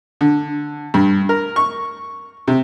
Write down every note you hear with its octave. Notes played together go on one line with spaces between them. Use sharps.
D3
G2
A#4
C#6
C3